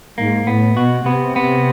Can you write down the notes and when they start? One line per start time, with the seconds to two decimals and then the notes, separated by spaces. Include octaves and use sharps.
0.18 G#2 A#3
0.47 A2 B3
0.77 B2 F#4
1.06 C3 B3
1.36 B3